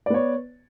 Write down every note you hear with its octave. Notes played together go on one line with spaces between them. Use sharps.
B3 C#5 D5